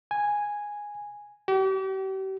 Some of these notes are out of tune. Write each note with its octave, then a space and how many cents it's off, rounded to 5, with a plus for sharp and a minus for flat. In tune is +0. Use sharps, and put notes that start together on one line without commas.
G#5 -5
G4 -40